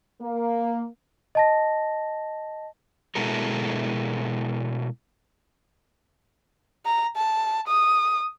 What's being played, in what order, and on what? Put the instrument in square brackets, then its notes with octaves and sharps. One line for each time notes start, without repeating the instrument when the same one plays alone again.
[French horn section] A#3
[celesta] D#5 A5 A#6
[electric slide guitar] B2 G#3 E4 A4 A#4
[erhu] A#5
A5
D#6